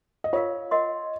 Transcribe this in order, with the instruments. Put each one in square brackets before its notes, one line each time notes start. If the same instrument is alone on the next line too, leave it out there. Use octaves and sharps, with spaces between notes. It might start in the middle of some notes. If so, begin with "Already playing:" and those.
[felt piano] D#5
[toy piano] F4 A#4 F5 [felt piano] C#5
[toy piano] A#4 D#5 F#5 C6